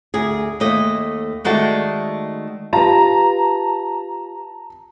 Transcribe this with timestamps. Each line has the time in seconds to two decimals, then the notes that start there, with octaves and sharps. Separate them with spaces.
0.14 D2 G#4
0.60 D#2 A3 D#5
1.45 D#3 G#3 A3 F#4 D5 A5
2.73 F4 G4 B4 A5 A#5